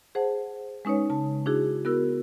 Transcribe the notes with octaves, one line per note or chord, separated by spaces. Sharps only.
G#4 C5 F#5 A5
G#3 C#4 D#4 B4 C#5
C#3 A5
D4 E4 F#4 G#4
B3 E4 F#4 A#4 E6